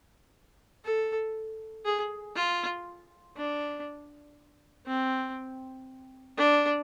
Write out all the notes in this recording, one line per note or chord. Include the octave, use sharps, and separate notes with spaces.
A4
G#4
F4
D4
C4
D4